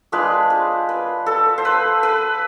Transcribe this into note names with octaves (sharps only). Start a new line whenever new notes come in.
G#3 D4 F4 B4
C5
B4
A4
C5
B4
B4